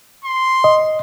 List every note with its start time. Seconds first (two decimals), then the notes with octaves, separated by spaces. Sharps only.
0.24 C6
0.64 D#5